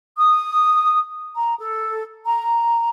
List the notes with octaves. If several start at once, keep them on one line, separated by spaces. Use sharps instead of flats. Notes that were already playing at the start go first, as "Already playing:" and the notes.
D#6
A#5
A4
A#5